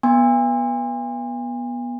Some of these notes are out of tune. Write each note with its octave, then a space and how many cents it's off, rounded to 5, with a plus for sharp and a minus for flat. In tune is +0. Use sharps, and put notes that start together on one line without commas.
B3 -20 G#5 -40 C6 +0